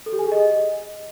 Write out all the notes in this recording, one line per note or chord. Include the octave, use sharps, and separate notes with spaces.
A4
G4
G#5
G#4
D#5